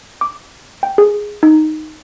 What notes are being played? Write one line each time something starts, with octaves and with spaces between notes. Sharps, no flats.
D6
G5
G#4
D#4